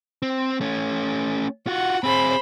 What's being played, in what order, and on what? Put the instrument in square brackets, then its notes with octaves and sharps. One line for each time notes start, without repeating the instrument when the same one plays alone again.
[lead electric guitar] C4
A3 C#4
[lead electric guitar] F4 F#4 [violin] F#5
[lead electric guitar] C4 G#4 [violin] C5 B5